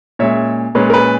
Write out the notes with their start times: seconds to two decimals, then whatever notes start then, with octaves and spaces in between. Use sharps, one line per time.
0.19 A#2 G#3 C#4 C#5 E5
0.75 A#2 G#3 C#4 B4
0.90 A#4
0.94 B4